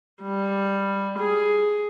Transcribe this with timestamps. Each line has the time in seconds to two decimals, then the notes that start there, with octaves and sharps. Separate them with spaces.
0.22 G3
1.18 G#4